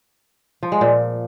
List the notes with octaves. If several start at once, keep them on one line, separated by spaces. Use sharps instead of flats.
F3
G#3
A#2